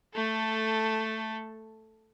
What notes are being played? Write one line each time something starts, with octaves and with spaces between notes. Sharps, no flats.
A3 A4